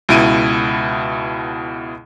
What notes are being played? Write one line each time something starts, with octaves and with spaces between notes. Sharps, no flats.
C#2 B2 E4 D7 D#7